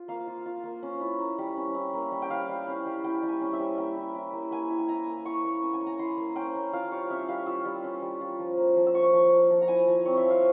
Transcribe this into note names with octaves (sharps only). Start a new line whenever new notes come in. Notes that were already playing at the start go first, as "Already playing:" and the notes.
Already playing: F4
A#3 F5
F4
F4
A#3
C#4
E4
A#3
G3
C#4
E4
A#3
G3
G5
E4 F5
G3
C#4
G3
E4 G5
G3
G#5
C#4
E5
G3
A#3 G5
E4
E4
A#3
A#3 G#5
E4
G#5
E4 A#5
A#3
E4 C#6
A#3
C#4
G#5
A#3
A#5
E4 C6
A#3
C#4 G5
A#3
F4 F5
G3 C#5
C#4 E5
G3 F5
F4 E6
G3
C#4
G3
F4
F3
A#3
F3
E6
F4 C#6
F3
A#3
F3
A#5
E4 G#5
F3
C4 C#5
E5
F3
F5